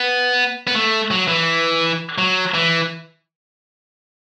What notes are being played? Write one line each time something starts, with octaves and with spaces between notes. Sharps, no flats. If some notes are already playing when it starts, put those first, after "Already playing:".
Already playing: B3
B3
A3
F#3
E3
F#3
E3